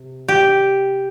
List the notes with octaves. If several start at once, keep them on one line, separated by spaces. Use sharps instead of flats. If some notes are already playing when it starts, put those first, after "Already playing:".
Already playing: C3
G4